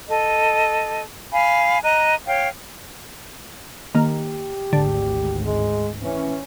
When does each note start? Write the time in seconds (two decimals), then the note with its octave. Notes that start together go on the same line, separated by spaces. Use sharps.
0.08 A4 D#5
1.32 F5 G#5 B5
1.82 D#5 A#5 F#6
2.26 C#5 F5 G5
3.95 D#3 A#3 G4
4.73 G#1 D2 D3
5.46 G#3
6.03 E3 C#4